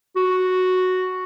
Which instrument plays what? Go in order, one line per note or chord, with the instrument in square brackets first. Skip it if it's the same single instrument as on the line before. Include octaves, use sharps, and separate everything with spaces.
[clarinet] F#4